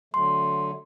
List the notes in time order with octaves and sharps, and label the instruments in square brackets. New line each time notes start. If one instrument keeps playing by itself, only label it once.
[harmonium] D3 F#3 A3 [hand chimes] C6